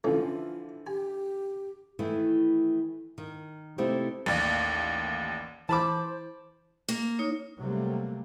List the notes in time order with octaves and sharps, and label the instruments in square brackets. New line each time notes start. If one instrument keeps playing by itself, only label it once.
[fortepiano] D3 E3 F3 [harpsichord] A3 C#4 [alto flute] F4
[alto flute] G4 [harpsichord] G#5
[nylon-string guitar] D#3 E3 A3 E4
D#3
C3 A3 C4 D#4 E4 G4
[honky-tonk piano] A1 D#2 D5
[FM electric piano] E3 [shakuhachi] C5 [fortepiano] A5 B5 D6
[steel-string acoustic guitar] A#3
[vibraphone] D#4 C#5
[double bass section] C3 F#3 G3 A3 A#3